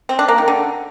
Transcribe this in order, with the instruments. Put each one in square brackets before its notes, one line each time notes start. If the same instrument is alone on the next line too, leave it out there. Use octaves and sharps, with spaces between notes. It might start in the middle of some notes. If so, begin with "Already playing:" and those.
[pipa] C4
D4
A#3
D#3
D3